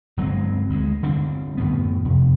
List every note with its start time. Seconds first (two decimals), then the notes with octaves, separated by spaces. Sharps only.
0.17 G1 F#3 G#3 C4
0.69 D2 G#3
1.03 D3 G3 C4 D4
1.57 F#2 A2 D#3 B3
2.05 F2 C3